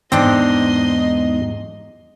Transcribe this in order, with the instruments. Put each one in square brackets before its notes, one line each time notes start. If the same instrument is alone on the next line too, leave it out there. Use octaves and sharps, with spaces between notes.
[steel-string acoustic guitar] E2 G#2 D#4 [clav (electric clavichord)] C4 D4 [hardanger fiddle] D#5 C6